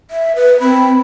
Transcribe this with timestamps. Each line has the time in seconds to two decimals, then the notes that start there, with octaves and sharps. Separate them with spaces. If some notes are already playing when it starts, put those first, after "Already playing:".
0.11 E5
0.36 B4
0.60 C4 B5